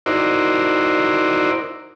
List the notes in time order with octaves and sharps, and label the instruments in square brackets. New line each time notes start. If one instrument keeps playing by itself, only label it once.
[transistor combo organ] D#4 E4 F#4 A#4 C5 D5